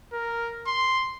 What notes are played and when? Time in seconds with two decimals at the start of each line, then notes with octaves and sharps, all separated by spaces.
0.13 A#4
0.66 C6